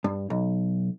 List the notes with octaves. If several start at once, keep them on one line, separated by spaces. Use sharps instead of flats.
G2
B1